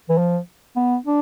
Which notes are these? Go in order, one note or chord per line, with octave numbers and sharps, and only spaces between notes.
E3
F3
B3
D4